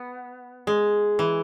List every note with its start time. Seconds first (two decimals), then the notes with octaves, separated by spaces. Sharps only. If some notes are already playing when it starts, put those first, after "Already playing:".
Already playing: B3
0.67 G#3
1.19 E3